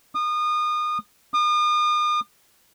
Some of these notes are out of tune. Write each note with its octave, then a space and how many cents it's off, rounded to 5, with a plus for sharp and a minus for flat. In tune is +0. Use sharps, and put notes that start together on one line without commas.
D#6 -30
D#6 -40